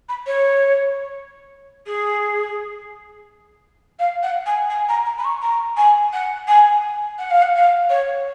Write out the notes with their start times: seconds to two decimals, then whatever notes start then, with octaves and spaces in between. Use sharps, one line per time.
0.09 B5
0.26 C#5
1.86 G#4
3.99 F5
4.23 F#5
4.46 G#5
4.70 G#5
4.88 A#5
5.05 A#5
5.18 B5
5.24 C#6
5.42 A#5
5.77 G#5
6.13 F#5
6.48 G#5
7.18 F#5
7.30 F5
7.42 F#5
7.55 F5
7.90 C#5